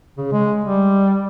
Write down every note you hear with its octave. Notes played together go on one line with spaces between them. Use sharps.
C#3
G#3
G3